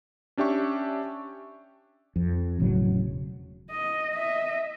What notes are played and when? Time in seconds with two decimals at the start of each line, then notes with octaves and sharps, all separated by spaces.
0.37 C#4 D4 G4 E5 C#6
2.16 F2
2.60 E1 A2 C#3 F#3
3.70 D#5
4.14 D#5 E5